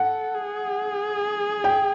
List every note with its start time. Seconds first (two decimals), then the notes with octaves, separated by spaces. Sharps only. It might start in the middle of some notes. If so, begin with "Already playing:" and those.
Already playing: A4 F#5
0.34 G#4
1.64 G5